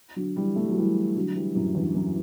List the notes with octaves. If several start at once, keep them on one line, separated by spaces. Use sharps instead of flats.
D3 F#3
E3 G3
A3
G3
F#3
E3 G3
D3 F#3
E3 G3
F#2 A2
E2 G2
F#2